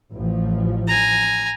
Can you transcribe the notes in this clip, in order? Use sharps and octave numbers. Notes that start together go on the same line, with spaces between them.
A1 F3
G#5 A#5